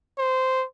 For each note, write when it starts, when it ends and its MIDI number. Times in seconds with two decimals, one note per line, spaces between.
0.18 0.65 72